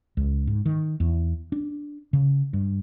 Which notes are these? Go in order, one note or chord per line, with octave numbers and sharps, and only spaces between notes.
C#2
G#2
D#3
E2
D4
C#3
G2